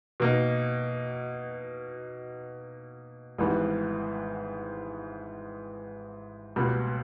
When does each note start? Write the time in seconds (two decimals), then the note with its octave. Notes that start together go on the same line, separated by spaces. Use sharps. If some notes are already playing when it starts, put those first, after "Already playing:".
0.20 B2 A#3 D#4
3.38 G#1 G#2 E3 G3 B3
6.56 C#2 B2 G3 A#3